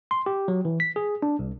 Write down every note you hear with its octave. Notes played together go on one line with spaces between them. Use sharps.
C6
G4
F#3
E3
B6
G#4
D4
C2